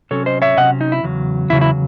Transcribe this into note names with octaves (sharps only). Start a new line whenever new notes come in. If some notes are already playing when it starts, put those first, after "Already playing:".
C3 F#3 C#4 A4 C#5
C5 D#5
C#5 E5
C3 F#3 C#4 D#5 F#5
D#4
E4
E2 C#3 F#3
E2 C#3 F#3 E4
E4